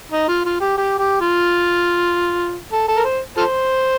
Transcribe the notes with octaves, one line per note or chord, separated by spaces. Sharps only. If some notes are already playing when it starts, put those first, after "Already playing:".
D#4
F4
F4
G4
G4
G4
F4
A4
A4
A#4
C5
F4 A4 C5